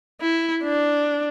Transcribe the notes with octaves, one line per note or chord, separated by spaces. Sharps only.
E4
D4